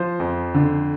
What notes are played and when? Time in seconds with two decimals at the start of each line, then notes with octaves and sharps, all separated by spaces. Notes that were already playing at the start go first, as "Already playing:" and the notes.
Already playing: F3 C5
0.20 F2
0.54 D3